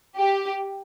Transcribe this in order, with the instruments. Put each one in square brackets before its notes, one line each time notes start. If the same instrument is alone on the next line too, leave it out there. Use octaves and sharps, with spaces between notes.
[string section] G4